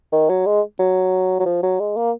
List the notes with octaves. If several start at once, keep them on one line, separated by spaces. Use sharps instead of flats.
D#3
F#3
G#3
F#3
F#3
F3
F#3
G#3
A#3